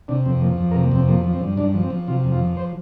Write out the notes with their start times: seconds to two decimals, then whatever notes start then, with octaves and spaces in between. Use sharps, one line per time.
0.08 C3 D4
0.26 F2 C4
0.41 F3 A#3
0.59 F2
0.71 A#4
0.75 C3
0.83 A#3
0.92 F2 C4
1.09 F3 A#3
1.24 F3
1.33 C4
1.41 G2
1.57 G2 D4
1.74 F3
1.83 C4
1.90 F3
2.08 C3 F4
2.24 F2
2.32 F4
2.40 F3
2.57 C5